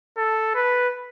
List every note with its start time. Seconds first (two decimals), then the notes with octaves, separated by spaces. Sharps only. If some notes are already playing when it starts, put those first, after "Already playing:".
0.17 A4
0.55 B4